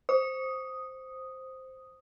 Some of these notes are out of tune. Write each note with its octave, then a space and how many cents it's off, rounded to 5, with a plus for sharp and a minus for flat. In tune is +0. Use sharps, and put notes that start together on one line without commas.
C5 +0 D#6 +0